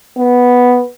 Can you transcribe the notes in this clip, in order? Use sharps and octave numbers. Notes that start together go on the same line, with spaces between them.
B3